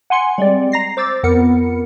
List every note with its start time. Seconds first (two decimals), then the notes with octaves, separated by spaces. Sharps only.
0.10 F#5 G#5 C6 C#7
0.38 G3 G#3 C4 D5
0.72 A#5 A#6 C7
0.97 C5 D6 E6 A6
1.23 F2 B3 A#4 C#7